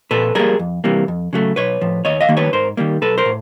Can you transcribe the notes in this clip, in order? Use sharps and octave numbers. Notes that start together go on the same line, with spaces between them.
A#2 A4 B4
G3 A#3 G#4 A#4
F2
C3 E3 G3 A#3
F2
C#3 F#3 A3
B1 B4 C#5
A2 F3
D#2 C#5 D#5
D#5 F5
D#3 G3 A#3
B4 C#5
G#2 A#4 C5
D#3 G3 A#3
B1 A4 B4
A#4 C5
A2